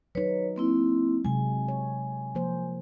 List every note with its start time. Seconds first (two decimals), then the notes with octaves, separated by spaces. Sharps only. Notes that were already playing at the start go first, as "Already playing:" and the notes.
0.15 F#3 D#4 B4 C#5
0.56 A#3 C4 E4
1.25 C3 F#3 G#3 G#5
1.68 C#5
2.35 F3 A#3 C5